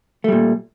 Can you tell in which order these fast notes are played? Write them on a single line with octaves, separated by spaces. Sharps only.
A3 G3 A#2